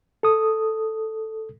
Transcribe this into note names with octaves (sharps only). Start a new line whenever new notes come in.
A4 D#6